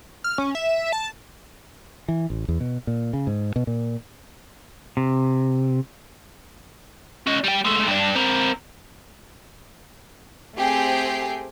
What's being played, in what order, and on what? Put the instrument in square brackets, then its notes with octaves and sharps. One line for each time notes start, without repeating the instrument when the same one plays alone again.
[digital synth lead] F6
C#4
E5
A5
[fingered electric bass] E3
A1
E2
B2
A#2
C#3
G#2
B2
A#2
[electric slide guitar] C3
[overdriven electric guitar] C#4 D#5
G3 G5
G#3 A3
G2 D4
C4 A#4
[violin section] A3 C4 G4 G#4 G5 C7